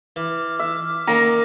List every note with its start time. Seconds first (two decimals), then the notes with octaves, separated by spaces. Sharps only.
0.16 E3 D6 F6
0.60 E5
1.08 D#3 A#3 C#4 A#5